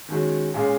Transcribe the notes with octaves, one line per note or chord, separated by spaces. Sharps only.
D#3 G#3 C#4 F#4
A#2 G#3 C#4 F4 G#4